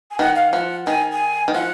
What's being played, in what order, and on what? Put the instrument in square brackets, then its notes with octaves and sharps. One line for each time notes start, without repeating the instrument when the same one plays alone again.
[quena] G#5
[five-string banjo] D#3 [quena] F#5
[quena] F5
[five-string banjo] F3 [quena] F#5
[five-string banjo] D#3 [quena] G#5
[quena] G#5
[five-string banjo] D#3
[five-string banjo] F3 [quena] F#5